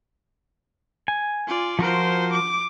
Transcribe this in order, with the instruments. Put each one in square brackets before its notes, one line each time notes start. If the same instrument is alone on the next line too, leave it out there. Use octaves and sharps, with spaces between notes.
[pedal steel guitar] G#5
[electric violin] F4 D5
[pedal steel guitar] F3 F#4 A#4 [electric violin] F4 C5
[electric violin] D6